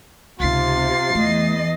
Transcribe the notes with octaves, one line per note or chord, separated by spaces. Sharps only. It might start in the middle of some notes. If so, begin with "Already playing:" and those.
C#2 C3 D#4 F4 A6 C7
E2 E3 A3 D#5